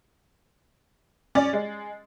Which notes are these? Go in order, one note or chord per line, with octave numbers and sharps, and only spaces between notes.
C#4 D5 A6
G#3